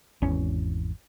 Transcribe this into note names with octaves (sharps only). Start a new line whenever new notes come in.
G#1 E2 C#4